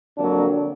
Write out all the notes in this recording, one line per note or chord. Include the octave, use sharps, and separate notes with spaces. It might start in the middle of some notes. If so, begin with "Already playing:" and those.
F2 D3 F#3 A#3 D4